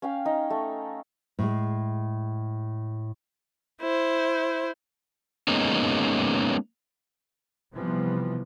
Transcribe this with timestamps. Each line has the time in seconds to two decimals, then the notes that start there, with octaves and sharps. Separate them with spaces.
0.02 C#4 F5 G5
0.25 D#4
0.50 A3
1.39 A2 G#3
3.82 E4 C5
5.48 G#3 A#3 B3 C#4 D#4
7.74 C3 E3 F3 G3 B3